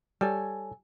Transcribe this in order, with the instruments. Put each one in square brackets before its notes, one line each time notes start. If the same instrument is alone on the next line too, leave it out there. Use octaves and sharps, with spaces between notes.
[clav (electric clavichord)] G3 [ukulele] A4 C#5 G#5